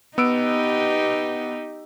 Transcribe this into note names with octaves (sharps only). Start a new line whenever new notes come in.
B3 D#4 G4 E6 D7